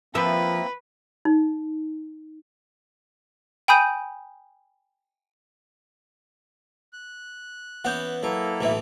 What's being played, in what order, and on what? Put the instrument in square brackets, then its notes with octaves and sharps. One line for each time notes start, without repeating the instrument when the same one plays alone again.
[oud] F3 E5 [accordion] A#3 C4 [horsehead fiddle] B4
[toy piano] D#4
[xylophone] G5 G#5 B5 D#6 G6 D#7
[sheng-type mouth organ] F#6
[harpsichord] E3 B3 C#4 [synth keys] F#5 G6
[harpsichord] F#3 [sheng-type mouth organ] A#3 E4 A4 [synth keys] B4
[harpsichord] B1 A2 E3 [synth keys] E5 A5